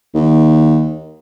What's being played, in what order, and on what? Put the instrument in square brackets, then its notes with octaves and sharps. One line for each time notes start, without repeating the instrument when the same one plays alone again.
[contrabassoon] D#2